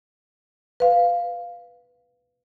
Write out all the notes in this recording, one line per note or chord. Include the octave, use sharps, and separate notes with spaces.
B4 F5